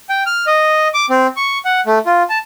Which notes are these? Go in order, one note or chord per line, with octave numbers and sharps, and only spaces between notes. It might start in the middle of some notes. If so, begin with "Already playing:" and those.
G5
F6
D#5
D6
C4
C#6
F#5
A3
F4
A5